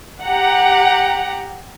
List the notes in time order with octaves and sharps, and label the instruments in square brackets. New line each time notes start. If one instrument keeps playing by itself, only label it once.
[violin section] G4 F#5 A#5